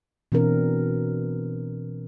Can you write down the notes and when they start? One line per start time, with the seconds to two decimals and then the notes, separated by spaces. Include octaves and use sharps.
0.32 B2 E3 C4 D4 A#4